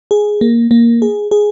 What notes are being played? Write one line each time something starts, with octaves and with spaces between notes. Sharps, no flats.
G#4
A#3
A#3
G#4
G#4